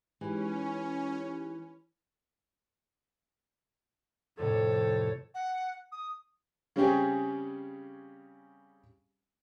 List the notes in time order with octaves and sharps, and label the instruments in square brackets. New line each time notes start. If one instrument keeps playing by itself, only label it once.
[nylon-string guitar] E3 [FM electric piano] G#3 D#4 G4 [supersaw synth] C#4
[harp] F2 A2 C3 [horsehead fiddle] A4 C#5
[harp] G4
[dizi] F#5
D#6
[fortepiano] C#3 G3 C4 C#4 G4 G#4